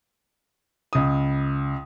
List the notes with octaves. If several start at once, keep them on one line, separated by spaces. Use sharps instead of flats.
C#2 D#6